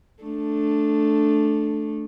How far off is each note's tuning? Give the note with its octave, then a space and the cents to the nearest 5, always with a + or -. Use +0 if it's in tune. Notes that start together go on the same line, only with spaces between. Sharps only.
A3 +0 D4 +5